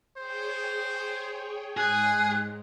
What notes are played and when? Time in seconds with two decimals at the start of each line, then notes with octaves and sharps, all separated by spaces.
0.17 G#4 C5 C#5 G5
1.77 G#2 G#3 G#4 G#5 F#6